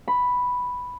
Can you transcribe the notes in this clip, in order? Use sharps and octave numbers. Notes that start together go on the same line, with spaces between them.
B5